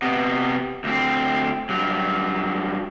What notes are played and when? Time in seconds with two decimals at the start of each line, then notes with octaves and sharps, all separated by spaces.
0.02 C3 B3
0.84 D2 C4
1.69 G2 F#3